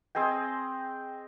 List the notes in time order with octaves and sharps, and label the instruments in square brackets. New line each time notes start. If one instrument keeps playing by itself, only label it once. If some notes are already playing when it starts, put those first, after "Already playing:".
[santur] C4 G#4 D#5 G5